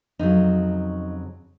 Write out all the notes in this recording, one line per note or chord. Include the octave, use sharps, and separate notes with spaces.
F2 C#3 F#3 D#4